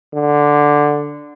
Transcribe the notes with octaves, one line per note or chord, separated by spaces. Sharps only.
D3